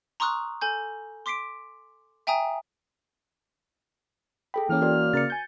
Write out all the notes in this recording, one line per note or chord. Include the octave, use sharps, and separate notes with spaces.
A#5 C6 C#6 D#6 F6 F#6
A4 G#5 G6
C6 D6 B6 C7 D7
E5 G5 G#5 A#5 D#6
G#4 A4 G5 B5
E3 A#3 C#4 F6
F#4 A#4 D5
C#3 A#4 D5 A6 C#7
G#5 G6